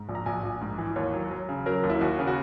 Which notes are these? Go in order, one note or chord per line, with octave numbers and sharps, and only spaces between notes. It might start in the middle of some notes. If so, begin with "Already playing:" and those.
Already playing: G#2
A#1
A#5
A#1 G#5
A#1
G#2
E3
D#2 C#5
F#3
F#3
C#3
F#3 A#4
D#2
E4
D#2 F#4
C#3
F#4